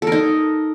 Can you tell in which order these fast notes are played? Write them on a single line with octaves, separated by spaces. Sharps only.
A4 A#4 D#4